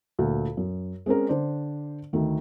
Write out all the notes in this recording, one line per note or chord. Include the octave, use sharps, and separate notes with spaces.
D2 A#2
F#2
G#3 C4 C#4 A#4
D3 D4 C5 D5
D2 D#3 A3